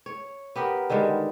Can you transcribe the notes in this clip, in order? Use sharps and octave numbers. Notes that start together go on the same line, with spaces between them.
C#5
B3 G4 A#4
D3 D#3 G3 G#3